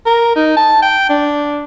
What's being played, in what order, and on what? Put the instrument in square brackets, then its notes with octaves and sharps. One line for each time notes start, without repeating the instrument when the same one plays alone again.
[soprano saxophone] A#4
D#4
A5
G5
D4